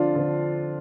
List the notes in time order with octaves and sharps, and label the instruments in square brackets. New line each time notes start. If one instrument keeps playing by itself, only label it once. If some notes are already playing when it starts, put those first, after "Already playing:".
Already playing: [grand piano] D3 F3 C4 [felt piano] D4 F4
[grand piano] D3 F3 C4